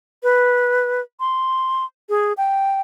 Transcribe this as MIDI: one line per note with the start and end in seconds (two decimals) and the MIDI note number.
0.23 1.01 71
1.20 1.85 84
2.09 2.33 68
2.37 2.81 79